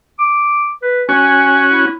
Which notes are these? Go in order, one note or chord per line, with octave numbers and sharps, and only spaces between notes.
D6
B4
C#4 F#4 G#5
E4